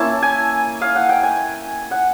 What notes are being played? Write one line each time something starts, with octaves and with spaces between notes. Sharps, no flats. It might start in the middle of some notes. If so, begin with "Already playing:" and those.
Already playing: A#3 C#4 E4 A5
G#5
F5
F#5
G5
G#5
F#5